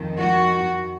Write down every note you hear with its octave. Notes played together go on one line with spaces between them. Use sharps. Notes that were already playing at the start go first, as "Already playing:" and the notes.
Already playing: F2 D#3
F#4